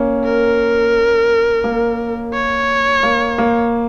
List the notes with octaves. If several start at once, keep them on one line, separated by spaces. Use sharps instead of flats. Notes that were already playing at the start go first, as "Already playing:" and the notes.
Already playing: A#3 C#4
A#4
A#3
C#5
A#3
A#3